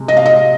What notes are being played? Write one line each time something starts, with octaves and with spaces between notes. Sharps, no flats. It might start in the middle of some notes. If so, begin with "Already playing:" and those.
Already playing: C3 G#3
D#5
F5
D#5